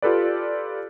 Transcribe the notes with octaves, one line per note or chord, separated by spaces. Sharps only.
F4 G4 A4 B4 D5